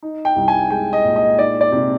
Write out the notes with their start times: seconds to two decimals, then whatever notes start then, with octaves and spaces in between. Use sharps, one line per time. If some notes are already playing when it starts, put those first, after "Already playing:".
0.03 D#4
0.25 G5
0.36 C2
0.48 G#5
0.70 G#3 G5
0.93 D#5
1.04 A#2
1.16 D#5
1.39 D#4 D5
1.61 D5
1.72 C3